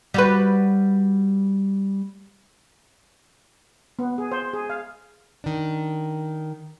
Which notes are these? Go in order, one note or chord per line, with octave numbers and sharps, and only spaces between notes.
G3 F#4 B4
B3
G#4
C5
G#4
F5
D#3 D4